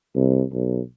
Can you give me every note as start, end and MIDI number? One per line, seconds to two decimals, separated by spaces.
0.15 0.42 36
0.53 0.80 35